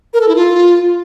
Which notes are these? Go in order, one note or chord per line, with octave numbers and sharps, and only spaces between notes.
A#4
A4
E4
F4